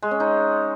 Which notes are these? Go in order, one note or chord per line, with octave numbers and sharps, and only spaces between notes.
G#3
C#4
D#4